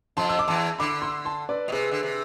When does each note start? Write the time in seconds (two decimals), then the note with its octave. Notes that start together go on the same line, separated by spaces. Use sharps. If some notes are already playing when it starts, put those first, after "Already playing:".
0.17 F2 F3 A5 C6
0.29 E6
0.39 D6
0.48 E2 E3 A5 C6
0.79 D3 B5 D6
1.02 C6 E6
1.25 A5 C6
1.49 B4 D5
1.68 B2
1.72 C3 G#4 B4
1.91 D3
2.03 C3